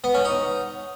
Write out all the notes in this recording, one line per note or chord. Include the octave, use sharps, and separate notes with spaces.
B3
C#4
D#4